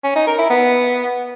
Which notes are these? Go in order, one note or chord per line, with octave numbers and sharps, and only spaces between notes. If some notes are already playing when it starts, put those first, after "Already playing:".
C#4
D#4
A#4
E4
B3